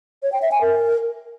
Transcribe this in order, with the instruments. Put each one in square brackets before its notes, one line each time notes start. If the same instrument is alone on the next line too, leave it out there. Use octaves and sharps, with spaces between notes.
[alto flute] C#5
G5
E5
G#5
A#4